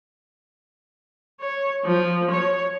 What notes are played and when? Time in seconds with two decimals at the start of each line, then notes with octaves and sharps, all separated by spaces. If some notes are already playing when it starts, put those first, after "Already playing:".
1.41 C#5
1.85 F3
2.31 C#5